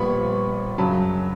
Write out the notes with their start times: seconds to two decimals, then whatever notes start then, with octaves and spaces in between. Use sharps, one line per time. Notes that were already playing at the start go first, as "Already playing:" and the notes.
Already playing: A#1 A#2 G3 B3 B5 C#6
0.78 F#2 C#3 F#3 A5 B5